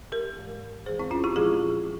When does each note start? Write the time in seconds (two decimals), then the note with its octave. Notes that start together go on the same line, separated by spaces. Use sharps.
0.12 G4 A#4
0.37 G#2 E3 G#3
0.86 E2 E3 G#3 G#4 C5
0.99 C4 E4
1.11 C#4 F4
1.24 E4 G4
1.36 A#2 F3 G#3 F4 G#4